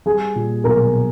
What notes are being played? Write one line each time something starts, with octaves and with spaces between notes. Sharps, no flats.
G3 G#4 G#5
A#2
B1 A#4 A#5